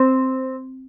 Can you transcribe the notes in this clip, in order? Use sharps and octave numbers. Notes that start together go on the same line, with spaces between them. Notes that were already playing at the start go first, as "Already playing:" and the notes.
Already playing: C4